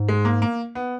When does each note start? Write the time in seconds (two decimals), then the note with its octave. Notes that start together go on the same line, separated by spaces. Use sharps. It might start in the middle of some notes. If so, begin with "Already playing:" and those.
Already playing: G#2
0.08 G#3
0.25 A#3
0.42 A#3
0.75 B3